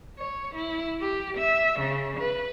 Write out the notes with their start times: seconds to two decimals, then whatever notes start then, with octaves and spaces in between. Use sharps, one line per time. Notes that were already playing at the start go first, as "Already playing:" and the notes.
0.19 C#5
0.55 E4
1.01 G4
1.38 E5
1.80 C#3
2.20 B4